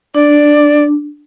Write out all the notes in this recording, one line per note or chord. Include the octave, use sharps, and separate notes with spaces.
D4 D5